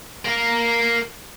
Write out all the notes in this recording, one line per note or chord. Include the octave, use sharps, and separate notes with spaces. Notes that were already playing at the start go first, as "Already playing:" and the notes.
A#4 F5